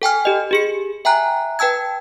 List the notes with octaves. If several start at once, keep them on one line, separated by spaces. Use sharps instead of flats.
A4 G5 G#5 F6
G4 D#5
G4 G#4 C#7
E5 G5 G#5 A#5 F#6
B4 G5 A5 E6 G#6